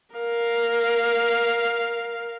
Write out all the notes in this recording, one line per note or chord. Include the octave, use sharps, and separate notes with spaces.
A#4 F5